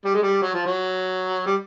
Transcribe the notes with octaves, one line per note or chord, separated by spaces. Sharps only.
G3
G#3
G3
F#3
F3
F#3
G3